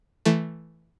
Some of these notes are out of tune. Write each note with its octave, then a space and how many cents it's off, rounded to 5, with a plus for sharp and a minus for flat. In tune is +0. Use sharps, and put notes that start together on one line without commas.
E3 +0 A3 +0